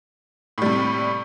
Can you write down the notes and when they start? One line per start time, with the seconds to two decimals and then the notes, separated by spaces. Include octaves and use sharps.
0.58 A2
0.62 G3
0.66 C3